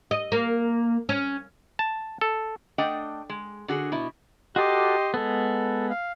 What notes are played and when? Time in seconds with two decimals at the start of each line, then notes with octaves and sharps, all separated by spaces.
0.11 D#5
0.32 A#3
1.09 C#4
1.79 A5
2.21 A4
2.78 A3 D4 D#5 F#5 G5
3.29 G#3
3.68 D3 F#4 G#4
3.92 B2 E4
4.56 F#4 G4 A4 D#5 C6 D6
5.14 G#3 B3 A4
5.90 F5